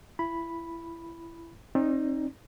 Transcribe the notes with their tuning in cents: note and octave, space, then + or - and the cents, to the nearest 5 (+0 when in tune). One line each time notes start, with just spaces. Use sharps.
E4 +25 B5 +0
C4 +40 D#4 +0 D5 +0